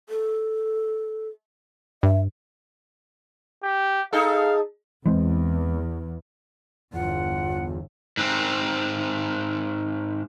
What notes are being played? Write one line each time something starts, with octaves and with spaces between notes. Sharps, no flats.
A4
G2 E5
G4
D#4 G#4 A4 F5
E2 E3 G#3 C4
G1 E2 F4 F#5
G#2 C4